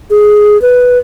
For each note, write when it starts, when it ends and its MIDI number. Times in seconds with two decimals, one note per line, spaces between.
0.10 0.60 68
0.62 0.98 71